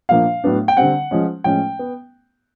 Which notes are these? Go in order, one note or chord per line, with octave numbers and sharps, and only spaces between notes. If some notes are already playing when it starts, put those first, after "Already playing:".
A#2 F3 A#3 D4 F5
A2 F#3 B3 D4
G5
D3 G3 C4 F#5
F3 G#3 C#4
A2 F3 G#3 C#4 G5
B3